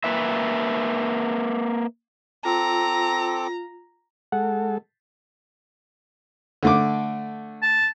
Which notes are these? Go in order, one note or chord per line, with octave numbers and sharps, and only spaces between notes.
A#3 B4 E5
C4 F4 A4 A#5 D6
G#3 A4 F#5
D3 A3 D6
A5